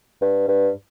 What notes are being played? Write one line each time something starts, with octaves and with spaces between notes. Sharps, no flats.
G2
G2